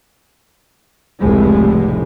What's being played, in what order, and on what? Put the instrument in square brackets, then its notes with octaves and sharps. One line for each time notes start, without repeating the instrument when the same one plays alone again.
[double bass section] F1 C#2 A2 G3 G#3